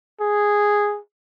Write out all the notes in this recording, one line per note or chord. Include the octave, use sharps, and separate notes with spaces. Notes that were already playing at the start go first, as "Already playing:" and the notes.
G#4